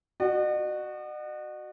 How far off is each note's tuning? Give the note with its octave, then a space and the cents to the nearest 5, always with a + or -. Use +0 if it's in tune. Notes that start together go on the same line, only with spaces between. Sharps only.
F#4 +0 D#5 -45